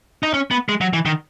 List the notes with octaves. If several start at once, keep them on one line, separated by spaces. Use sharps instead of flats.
D#4
C#4
B3
G#3
F#3
E3
D#3